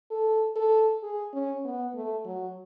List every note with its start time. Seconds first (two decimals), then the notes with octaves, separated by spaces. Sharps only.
0.11 A4
0.56 A4
1.03 G#4
1.33 C#4
1.65 B3
1.95 A3
2.25 F#3